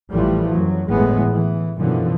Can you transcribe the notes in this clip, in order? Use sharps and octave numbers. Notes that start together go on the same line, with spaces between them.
A1 E3 F3 G3 A3
F#2 F#3
G1 A2 E3 G#3 A3 B3
E3
F#2 B2 D3 E3 F3